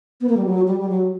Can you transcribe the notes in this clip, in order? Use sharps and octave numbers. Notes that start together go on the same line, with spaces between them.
B3
A#3
G3
F#3
G3
G3
F#3